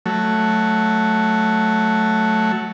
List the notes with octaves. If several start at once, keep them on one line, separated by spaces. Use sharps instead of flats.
F#3 A3